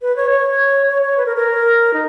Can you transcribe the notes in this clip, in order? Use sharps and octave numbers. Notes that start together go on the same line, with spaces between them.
B4
C#5
C#5
C#5
C#5
B4
A#4
A#4
D#4